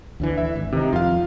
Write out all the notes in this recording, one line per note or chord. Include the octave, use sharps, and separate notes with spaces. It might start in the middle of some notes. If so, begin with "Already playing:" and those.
D2 D3 E3
E5
G#1
C3 D#3 D#4
F2 F4 F5